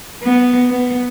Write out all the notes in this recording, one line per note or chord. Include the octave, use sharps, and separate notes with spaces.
B3
B3